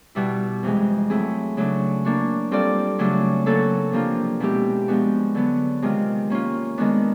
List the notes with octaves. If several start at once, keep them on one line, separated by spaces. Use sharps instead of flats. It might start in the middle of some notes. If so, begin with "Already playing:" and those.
B2 G3 B3 E4
F2 C3 E3 G#3
F#3 A3 C4 E4 G#4
C#3 F#3 A3 D4
A#3 D4 F#4
G3 C4 F4 A4 D5
C#3 F#3 A3 D4 F4
F#3 A#3 C#4 F#4 A4
C3 F3 A#3 D4 F4
B2 G#3 C4 E4 G4
F3 G#3 B3 D4 F#4
D3 F#3 B3
C3 D#3 G#3 C4 F4
A#3 C#4 F4
D#3 G#3 B3 D4